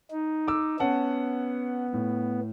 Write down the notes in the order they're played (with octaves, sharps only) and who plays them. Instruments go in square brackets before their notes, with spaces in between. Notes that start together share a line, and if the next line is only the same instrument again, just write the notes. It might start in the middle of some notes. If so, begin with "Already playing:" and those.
[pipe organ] D#4
[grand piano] D6 E6
[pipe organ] B3 [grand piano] C#4 F#5 A5
[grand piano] A2